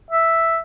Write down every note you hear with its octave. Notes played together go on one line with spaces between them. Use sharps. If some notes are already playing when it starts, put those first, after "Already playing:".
E5